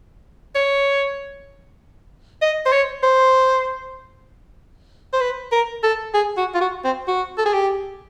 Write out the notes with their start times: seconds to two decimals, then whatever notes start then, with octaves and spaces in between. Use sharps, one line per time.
0.55 C#5
2.42 D#5
2.66 C5
2.72 C#5
3.03 C5
5.13 C5
5.21 B4
5.52 A#4
5.83 A4
6.14 G#4
6.37 F#4
6.55 F4
6.61 F#4
6.84 C4
7.08 F#4
7.38 A4
7.46 G#4
7.53 G4